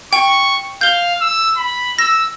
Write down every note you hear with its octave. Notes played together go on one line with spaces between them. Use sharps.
G5 C#6
F5 G6 G7
E6
B5
E6 A#6